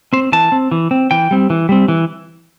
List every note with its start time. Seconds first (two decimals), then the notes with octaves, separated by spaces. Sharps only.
0.13 C4 C5
0.32 E3 A5
0.52 C4
0.72 E3
0.91 C4
1.11 E3 G5
1.31 G3 C4
1.50 E3
1.69 G3 C4
1.88 E3